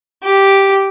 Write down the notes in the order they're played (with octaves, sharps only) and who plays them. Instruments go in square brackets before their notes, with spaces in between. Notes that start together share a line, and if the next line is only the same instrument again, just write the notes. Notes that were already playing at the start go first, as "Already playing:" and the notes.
[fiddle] G4